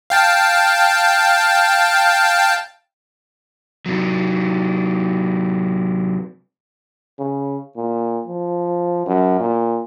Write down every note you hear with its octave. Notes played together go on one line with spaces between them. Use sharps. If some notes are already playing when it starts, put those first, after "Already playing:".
F5 G5 A5
C3 F#3
C#3
A#2
F3
F#2
A#2